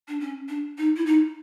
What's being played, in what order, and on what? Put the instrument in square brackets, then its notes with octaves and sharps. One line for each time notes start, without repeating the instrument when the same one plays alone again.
[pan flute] D4
C#4
D4
D#4
E4
D#4